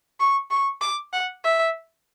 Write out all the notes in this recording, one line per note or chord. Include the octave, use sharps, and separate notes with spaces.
C#6
C#6
D6
F#5
E5